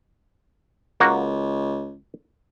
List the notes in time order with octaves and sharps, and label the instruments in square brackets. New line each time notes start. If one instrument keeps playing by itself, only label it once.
[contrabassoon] C#2 [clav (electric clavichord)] A#3 F#4